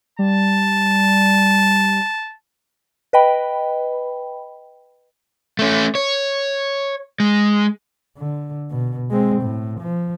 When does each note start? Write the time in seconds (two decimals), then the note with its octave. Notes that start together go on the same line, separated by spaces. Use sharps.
0.19 G3 A5
3.13 B4 D#5 G5 B5
5.59 A3 C#4
5.95 C#5
7.20 G#3
8.17 D3
8.71 B2
9.10 G#3 C4
9.42 A2
9.80 F3